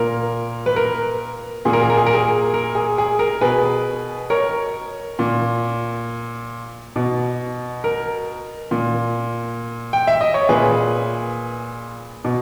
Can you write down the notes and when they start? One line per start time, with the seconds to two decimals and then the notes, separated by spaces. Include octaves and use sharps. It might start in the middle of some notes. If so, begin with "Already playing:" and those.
Already playing: A#2 A#4
0.66 B4
0.76 A#4
1.65 A#2 G#4
1.73 A#4
1.82 G#4
1.90 A#4
1.97 G#4
2.07 A#4
2.14 G#4
2.54 A#4
2.75 G#4
2.98 G#4
3.19 A#4
3.41 B2 G#4 B4
4.30 A#4 C#5
5.19 A#2
6.96 B2
7.84 A#4
8.71 A#2
9.93 G5
10.07 E5
10.21 D#5
10.34 C#5
10.49 A#2 G#4 B4
12.25 B2